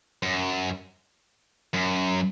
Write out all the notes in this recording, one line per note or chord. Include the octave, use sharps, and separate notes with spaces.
F#2
F#2